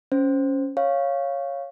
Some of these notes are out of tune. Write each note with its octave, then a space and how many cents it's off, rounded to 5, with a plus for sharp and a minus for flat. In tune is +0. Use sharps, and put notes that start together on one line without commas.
C#4 +0 C5 +0
C#5 -5 F5 +0